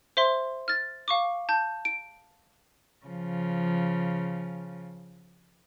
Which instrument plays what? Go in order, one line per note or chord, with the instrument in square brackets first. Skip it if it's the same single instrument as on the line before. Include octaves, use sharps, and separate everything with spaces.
[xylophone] C5 E5 C6
F6 A6
F5 C#6 D6
A5 G6
D7
[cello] C#3 F3